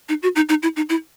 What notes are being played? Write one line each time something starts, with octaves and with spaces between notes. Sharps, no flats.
D#4
F#4
D#4
D#4
E4
D#4
E4